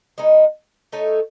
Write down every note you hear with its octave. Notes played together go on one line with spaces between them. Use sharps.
G#3 B3 D#4
A3 D#4 A4 C#5